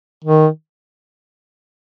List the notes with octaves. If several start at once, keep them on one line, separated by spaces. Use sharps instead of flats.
D#3